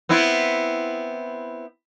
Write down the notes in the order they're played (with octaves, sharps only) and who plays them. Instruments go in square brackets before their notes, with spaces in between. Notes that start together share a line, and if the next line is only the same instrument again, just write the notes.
[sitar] B3 C4 E4